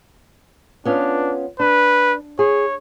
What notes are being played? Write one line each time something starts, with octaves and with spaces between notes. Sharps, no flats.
B3 C#4 D4 F4
D4 B4
G#4 C#5